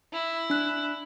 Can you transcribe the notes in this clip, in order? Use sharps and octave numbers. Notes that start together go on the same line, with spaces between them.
E4
D4 F#6